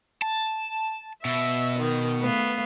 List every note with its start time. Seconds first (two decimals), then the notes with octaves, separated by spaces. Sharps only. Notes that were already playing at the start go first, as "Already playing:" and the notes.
0.22 A5
1.25 B2 E5
1.79 D#3
2.21 A3 B3 F5